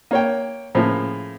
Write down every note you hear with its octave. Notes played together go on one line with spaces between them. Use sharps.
A#3 C#5 G5
A2 C#3 F3 A#3